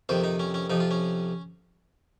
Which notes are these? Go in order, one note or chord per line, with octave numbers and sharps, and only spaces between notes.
F2 C3 D#3 C5
D#4
C#4
C#4
F2 C3 F3 D#4
F4
C#4